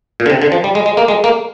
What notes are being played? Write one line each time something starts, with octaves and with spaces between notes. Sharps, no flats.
A#2
D3
C3
D3
F3
G3
G#3
G#3
A#3
G#3
A#3